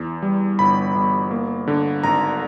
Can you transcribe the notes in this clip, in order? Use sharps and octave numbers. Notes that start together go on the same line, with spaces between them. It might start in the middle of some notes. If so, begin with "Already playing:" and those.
Already playing: E2
G3
G1 B5
G1
A#3
D3
G#1 A#5